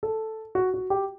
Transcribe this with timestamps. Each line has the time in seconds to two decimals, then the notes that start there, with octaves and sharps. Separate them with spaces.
0.03 A4
0.55 F#4
0.74 F#4
0.90 G4